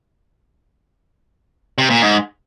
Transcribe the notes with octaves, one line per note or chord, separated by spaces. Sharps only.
C3
A#2
G#2